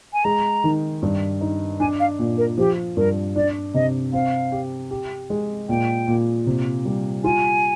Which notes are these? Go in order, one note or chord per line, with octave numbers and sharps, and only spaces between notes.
G#5
G#3 A#5
D#3
G2
D#4
D4 G#5
F5
A#2
A#4
F3 G4
G2 A#4
D4 D5
C3 D#5
C4 F5
G4
G4
G#3
A#2 G5
A#2
C3
G3
F4 G#5